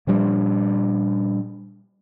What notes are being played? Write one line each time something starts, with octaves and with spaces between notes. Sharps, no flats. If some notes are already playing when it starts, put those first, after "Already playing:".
A#2 F3 G3 D4